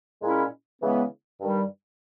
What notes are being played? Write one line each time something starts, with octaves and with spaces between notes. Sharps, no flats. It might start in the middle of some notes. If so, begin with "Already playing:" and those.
A#2 G#3 C#4 E4
C#3 E3 G#3 B3
G2 D#3 G3